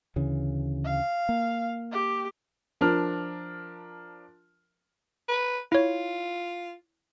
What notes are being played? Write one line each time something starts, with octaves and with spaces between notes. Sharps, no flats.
D2 C#3 E3
F5
A#3
G4
F3 D4 A#4 F6
B4
E4 F4 C#5